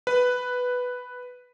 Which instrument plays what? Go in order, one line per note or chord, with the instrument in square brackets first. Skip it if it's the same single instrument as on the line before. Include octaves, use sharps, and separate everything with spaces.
[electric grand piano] B4